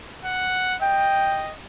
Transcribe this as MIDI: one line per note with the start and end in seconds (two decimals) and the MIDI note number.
0.25 0.76 78
0.82 1.56 75
0.82 1.50 79